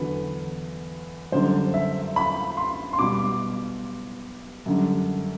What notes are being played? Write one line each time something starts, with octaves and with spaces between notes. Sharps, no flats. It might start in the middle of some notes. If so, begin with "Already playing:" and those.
Already playing: E2 D3 F#3 B4
F#2 D3 G3 C5
E5
B5
C6
C6
B2 G3 D6
F#2 D3 G3